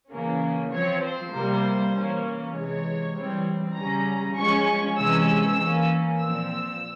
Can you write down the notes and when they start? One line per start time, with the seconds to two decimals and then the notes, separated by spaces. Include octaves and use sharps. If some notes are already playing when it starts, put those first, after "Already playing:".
0.11 C#3 E3 A#3 C#4
0.71 F3 C4 C#5
1.02 C5
1.33 C3 G3 A#3
1.93 E3 A#3 C#4
2.54 C3 E3 G#3 C#5
3.15 E3 G3 C4
3.76 C#3 G3 C#4 A#5
4.36 F3 G#3 C#4 C#6
4.97 C3 E3 G#3 C#4 E6
5.58 E3 A#3 C#4
6.19 A#2 F3 C4 E6